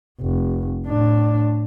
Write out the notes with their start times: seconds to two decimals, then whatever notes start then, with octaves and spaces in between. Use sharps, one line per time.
0.20 F1
0.87 A2 D4